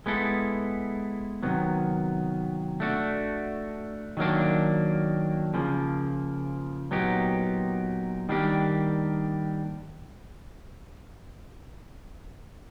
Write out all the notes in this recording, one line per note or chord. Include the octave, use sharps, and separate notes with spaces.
G#3 B3 E4 A4
C3 D#3 F#3 B3
A3 D4 F#4
D#3 F#3 A#3 D4
C#3 F3 A#3
A#2 F#3 B3 D#4 G4
D#3 G3 A#3 D4 G4